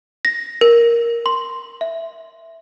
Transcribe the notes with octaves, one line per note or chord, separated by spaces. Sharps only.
A#6
A#4
C6
E5